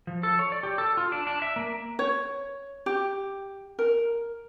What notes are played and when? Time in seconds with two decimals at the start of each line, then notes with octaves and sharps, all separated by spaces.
0.07 F3
0.23 A4
0.39 C#5
0.52 D5
0.63 G4
0.78 A4
0.97 F4
1.12 D4
1.27 D4
1.42 E5
1.56 A#3
1.99 C#5
2.86 G4
3.79 A#4